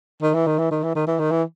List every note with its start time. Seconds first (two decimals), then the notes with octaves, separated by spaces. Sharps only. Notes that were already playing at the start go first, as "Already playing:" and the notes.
0.22 D#3
0.34 E3
0.47 D#3
0.59 E3
0.71 D#3
0.83 E3
0.95 D#3
1.07 E3
1.19 D#3
1.31 E3